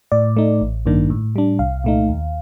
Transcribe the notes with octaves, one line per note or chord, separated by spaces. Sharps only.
A2 D5
A3 D#4
A1
G2 D#3 A#3 D4
A2
G3 D4
C2 F5
A#2 A3 D#4
D#2